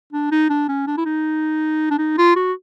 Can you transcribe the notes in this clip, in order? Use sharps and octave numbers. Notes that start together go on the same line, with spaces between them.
D4
D#4
D4
C#4
D4
E4
D#4
D4
D#4
F4
F#4